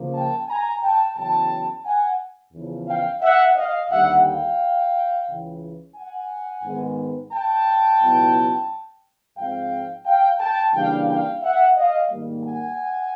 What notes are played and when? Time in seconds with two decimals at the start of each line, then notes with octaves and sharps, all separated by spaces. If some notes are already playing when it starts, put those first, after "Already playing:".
Already playing: C#3 F3 A#3
0.14 G5 A5
0.48 G#5 A#5
0.82 G5 A5
1.16 E2 C#3 F#3 G5 A5
1.85 F#5 G#5
2.53 E2 C#3 F3
2.87 F5 G5
3.22 E5 F#5
3.55 D#5 F5
3.90 D#2 D3 G3 E5 F#5
4.24 F5 G5
5.27 C#2 C#3 E3
5.95 F#5 G#5
6.63 G#2 D#3 G#3 B3
7.32 G5 A5
8.00 C#2 B2 F#3 B3 E4
9.37 G#2 F3 G#3 C4 F5 G5
10.06 F5 G5
10.39 G5 A5
10.73 C#3 E3 G3 A#3 D4 F5 G5
11.08 F5 G5
11.42 E5 F#5
11.76 D#5 F5
12.10 G#2 D#3 G3 A#3
12.45 F#5 G#5